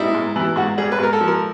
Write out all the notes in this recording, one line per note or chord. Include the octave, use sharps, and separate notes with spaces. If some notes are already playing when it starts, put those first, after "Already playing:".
Already playing: G#2 G3 D#4 E4
G#2
E3
G#2 F#4
G3 G#4
B4
G#2 A#4
A4
F3
A#4